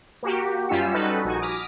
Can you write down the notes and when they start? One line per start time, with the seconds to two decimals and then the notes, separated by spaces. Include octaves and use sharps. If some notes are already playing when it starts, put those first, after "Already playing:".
0.23 A#3 F#4 G4
0.69 F#2 G3 C#4 F4 E6 C#7
0.94 G3 C#4 D#4 F#4 A4 B4
1.25 A#1 D#4 F#4 G#5
1.42 D6 D#6 F6 A#6 B6 D#7